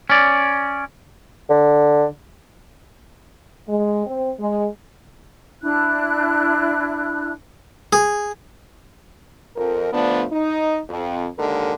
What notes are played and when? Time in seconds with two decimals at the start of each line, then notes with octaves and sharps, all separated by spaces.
0.10 C#4 D5
1.50 D3
3.69 G#3
4.06 C4
4.40 G#3
5.61 D4 E4 F#6
7.93 G#4
9.56 F2 A#4
9.93 D3 F3 A3 B3 D4
10.32 D#4
10.89 F2
11.38 D#2 D3 G#3 A4 A#4